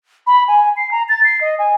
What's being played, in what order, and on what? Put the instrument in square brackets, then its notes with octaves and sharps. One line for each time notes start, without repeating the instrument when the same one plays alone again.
[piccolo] B5
G#5
C7
A#5
A6
C7
D#5
G#5